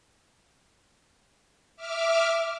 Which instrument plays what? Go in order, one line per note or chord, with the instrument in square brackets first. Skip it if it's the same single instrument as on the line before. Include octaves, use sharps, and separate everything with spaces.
[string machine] E5 D6 F6